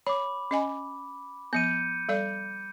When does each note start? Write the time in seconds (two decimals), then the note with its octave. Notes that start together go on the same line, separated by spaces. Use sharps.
0.07 C#5 B5 D6
0.51 C#4 D#5 G#5
1.53 F3 B3 G6 C#7 D#7
2.09 G3 A4 D5